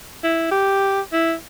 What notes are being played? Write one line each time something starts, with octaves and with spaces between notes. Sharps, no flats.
E4
G4
E4